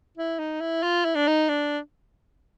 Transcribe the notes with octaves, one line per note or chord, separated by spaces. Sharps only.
E4
D#4
E4
F4
E4
D4
D#4
D4